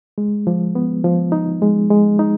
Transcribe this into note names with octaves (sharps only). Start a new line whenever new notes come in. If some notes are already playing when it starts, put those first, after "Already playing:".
G#3
F3
B3
F3
D#4
G#3
G#3
D#4